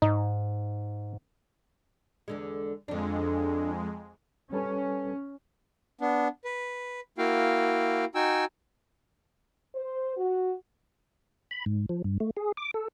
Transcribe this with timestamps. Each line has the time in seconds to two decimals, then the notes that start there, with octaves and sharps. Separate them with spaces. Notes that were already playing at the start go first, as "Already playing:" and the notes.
0.02 G#2 D#4
2.28 E2 D3 G#3
2.88 F2 D3 G#3 D4
4.53 G3 C#4 A4 B4
6.01 B3 D4
6.45 B4
7.18 A#3 E4 F#4 F5 G5
8.15 D#4 F#4 G5 G#5 E6
9.75 C5
10.17 F#4
11.51 B5
11.66 G#2
11.89 F3
12.04 G2
12.20 A3
12.37 G#4
12.57 D6
12.74 A4